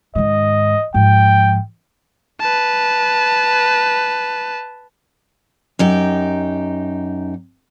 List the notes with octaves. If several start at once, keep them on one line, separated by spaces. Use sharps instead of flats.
G#2 D#3 D#5
G#2 F3 G5
B4 A5
F#2 D#4 G4